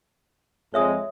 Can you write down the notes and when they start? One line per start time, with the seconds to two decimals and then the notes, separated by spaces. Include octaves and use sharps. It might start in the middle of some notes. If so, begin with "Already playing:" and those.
0.74 F2 G#3 C#5 E5 D#6